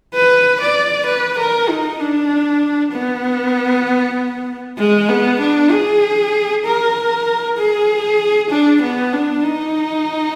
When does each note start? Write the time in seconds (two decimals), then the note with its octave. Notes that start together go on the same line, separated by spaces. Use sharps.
0.14 B4
0.61 D5
1.06 B4
1.38 A#4
1.69 D#4
2.00 D4
2.92 B3
4.78 G#3
5.09 B3
5.40 D4
5.72 G#4
6.65 A#4
7.58 G#4
8.50 D4
8.82 B3
9.13 D4
9.44 D#4